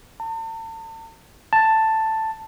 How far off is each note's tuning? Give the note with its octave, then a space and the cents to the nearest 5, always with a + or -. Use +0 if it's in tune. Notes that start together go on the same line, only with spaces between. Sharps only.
A5 +40
A5 +5